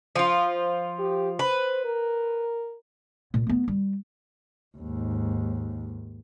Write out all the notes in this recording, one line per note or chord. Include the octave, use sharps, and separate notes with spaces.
F3 F4
G4
B4 C5
A#4
A#2
A3 B3
G3
D#2 G#2